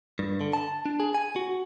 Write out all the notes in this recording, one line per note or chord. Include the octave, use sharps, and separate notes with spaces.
G2
D3
A5
D4
G#4
G#5
F#4